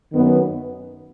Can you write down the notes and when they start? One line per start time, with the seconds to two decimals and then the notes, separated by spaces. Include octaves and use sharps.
0.13 F#2 D#3 F#3 B3